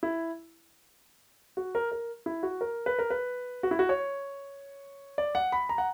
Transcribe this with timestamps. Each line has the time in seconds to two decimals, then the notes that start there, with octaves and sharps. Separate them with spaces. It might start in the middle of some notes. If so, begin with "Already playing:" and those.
0.03 E4
1.57 F#4
1.75 A#4
1.92 A#4
2.26 E4
2.43 F#4
2.61 A#4
2.86 B4
2.99 A#4
3.10 B4
3.63 F#4
3.71 E4
3.79 F#4
3.89 C#5
5.18 D5
5.35 F#5
5.52 B5
5.69 A#5
5.78 F#5